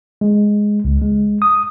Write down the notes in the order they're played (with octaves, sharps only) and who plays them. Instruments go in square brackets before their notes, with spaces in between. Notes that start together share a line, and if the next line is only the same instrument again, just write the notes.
[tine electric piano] G#3
C#2
G#3
D#6